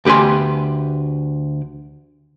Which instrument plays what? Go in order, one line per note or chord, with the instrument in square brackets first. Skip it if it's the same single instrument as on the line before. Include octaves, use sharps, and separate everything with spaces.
[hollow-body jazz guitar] D2 G4 B4 G#5 C6